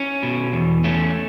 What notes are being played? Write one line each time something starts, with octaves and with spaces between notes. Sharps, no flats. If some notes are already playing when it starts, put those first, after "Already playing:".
Already playing: C#4 E4
B2
E2
A3 C#4